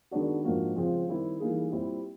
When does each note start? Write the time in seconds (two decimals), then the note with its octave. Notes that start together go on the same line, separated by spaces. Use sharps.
0.11 D#3 G#3 B3 D4 F#4
0.44 G#2 F3 A#3 D4 F#4
0.76 C#3 F3 G#3 C4
1.08 D#3 G3 C4 E4 G4
1.40 E3 G3 A#3 D#4 G#4
1.72 A#2 G3 C4 E4